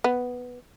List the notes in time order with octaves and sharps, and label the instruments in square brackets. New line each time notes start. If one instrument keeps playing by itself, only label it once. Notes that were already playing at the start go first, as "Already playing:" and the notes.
[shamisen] B3